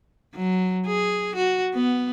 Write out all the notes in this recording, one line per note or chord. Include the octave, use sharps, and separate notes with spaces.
F#3
G#4
F#4
B3